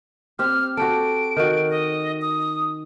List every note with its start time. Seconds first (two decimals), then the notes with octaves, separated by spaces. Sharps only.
0.39 C4 G4 F6
0.77 F#4 G4 A4 D7
1.36 D#3 F#4
1.69 D#5
2.22 D#6